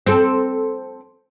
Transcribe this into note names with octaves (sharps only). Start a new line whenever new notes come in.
C4 A4